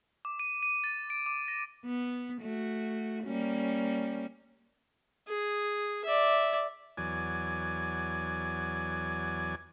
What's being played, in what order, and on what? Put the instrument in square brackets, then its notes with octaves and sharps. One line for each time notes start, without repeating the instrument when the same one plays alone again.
[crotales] D6
D#7
D#7
A6
D7
D6
A#6
[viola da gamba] B3
A3 F#4
G3 A#3 C#4
[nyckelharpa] G#4
D5 E5
[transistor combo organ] E2 F#3 D5 G#5